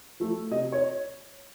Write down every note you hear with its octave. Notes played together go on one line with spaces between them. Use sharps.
F3 A3
C3 D#5
C#5